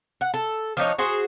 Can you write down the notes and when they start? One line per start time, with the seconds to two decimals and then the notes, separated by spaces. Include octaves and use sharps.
0.21 F#5
0.34 A4
0.77 F3 D4 D#4 C#5
0.98 F#4 G#4 C5